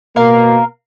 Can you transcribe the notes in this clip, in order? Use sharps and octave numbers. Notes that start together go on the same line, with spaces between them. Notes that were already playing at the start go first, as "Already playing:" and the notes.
B2 A#3 A#4 F5